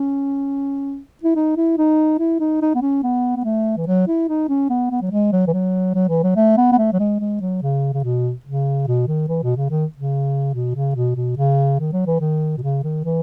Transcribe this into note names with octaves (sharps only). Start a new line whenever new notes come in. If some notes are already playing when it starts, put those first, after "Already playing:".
Already playing: C#4
E4
D#4
E4
D#4
E4
D#4
D#4
B3
C#4
B3
B3
A3
E3
F#3
E4
D#4
C#4
B3
B3
F#3
G#3
F#3
E3
F#3
F#3
E3
F#3
A3
B3
B3
A3
F#3
G#3
G#3
F#3
C#3
C#3
B2
C#3
B2
D#3
E3
B2
C#3
D#3
C#3
B2
C#3
B2
B2
C#3
D#3
F#3
E3
D#3
B2
C#3
D#3
E3